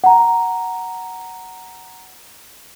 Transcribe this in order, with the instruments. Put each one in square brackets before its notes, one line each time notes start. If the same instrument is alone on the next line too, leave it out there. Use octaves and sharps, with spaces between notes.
[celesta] F#5 A#5